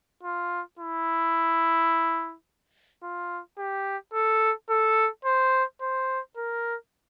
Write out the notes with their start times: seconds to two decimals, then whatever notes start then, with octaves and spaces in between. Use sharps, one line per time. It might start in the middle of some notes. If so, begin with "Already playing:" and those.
0.23 F4
0.79 E4
3.03 F4
3.58 G4
4.13 A4
4.70 A4
5.25 C5
5.81 C5
6.37 A#4